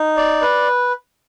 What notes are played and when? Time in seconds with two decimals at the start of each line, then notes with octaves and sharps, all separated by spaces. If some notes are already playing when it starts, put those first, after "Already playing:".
Already playing: D#4
0.17 D5
0.42 B4